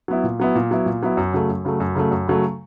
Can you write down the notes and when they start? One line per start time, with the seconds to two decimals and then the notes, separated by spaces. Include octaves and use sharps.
0.08 F#3 B3 E4
0.24 A#2
0.40 F#3 B3 E4
0.55 A#2
0.71 F#3 B3 E4
0.86 A#2
1.03 F#3 B3 E4
1.17 F#2
1.33 C#3 F#3 A3
1.49 F#2
1.65 C#3 F#3 A3
1.80 F#2
1.95 C#3 F#3 A3
2.11 F#2
2.28 C#3 F#3 A3